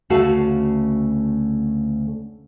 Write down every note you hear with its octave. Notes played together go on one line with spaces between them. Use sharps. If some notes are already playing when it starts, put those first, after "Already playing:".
D2 C#3 A3 F#4 F5 A5